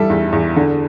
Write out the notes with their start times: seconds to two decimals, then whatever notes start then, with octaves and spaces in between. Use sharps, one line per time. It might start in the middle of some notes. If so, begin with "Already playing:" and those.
Already playing: E3 G3 A4 E5
0.10 E2
0.32 E2
0.56 D3